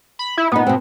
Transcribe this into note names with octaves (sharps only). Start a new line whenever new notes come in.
B5
E4
A#2 B3 D#4
B2 C4